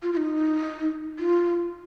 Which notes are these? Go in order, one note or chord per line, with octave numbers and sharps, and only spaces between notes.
F4
F4
D#4
F4